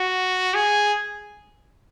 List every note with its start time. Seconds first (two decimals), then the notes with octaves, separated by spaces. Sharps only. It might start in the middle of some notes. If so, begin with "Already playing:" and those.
Already playing: F#4
0.54 G#4